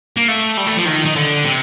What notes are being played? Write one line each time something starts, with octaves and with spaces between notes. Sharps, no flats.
A#3
A3
G3
A3
F3
D#3
D#3
D3
C3